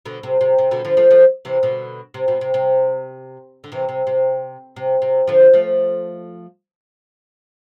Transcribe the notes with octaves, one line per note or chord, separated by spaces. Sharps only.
B2 D3
C3
C3
C3
B2 D3
D3 F3
F3 A3
F3 A3
C3 E3
B2 D3
C3
B2
C3
C3
D3
C3 E3
C3
C3
C3
C3
D3 F3
F3 A3